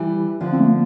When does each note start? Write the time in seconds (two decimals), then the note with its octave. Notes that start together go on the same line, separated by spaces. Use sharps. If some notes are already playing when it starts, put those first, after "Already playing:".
Already playing: E3 G3
0.41 D3 F3
0.52 C4
0.60 A3
0.65 A#3